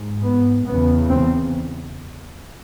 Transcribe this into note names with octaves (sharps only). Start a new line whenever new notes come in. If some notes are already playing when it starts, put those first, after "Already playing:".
Already playing: G#2
B3
E2 C#3 B3
C4